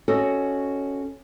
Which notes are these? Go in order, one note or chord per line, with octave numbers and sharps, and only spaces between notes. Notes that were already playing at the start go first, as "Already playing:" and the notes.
C#4 F#4 A4 C#5 D#5